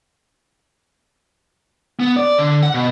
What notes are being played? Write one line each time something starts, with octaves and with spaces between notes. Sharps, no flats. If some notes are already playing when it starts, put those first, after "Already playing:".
B3
D5
D3
F#5
B2